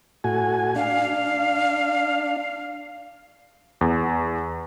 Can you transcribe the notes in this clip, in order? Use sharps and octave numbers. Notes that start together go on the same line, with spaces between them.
A2 F#4 G#5
D4 F5
E2